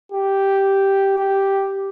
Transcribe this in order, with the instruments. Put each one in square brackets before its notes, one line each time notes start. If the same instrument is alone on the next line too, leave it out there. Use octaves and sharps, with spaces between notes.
[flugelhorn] G4
G4